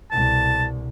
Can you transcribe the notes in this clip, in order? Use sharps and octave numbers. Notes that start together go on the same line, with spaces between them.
C2 B2 A5